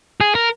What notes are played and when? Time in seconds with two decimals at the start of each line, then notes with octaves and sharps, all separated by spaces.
0.21 G#4
0.35 A#4